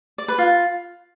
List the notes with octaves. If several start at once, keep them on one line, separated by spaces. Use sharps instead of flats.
D5
B4
F4